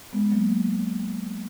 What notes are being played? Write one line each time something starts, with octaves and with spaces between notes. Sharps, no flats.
G#3 B3
F#3 A#3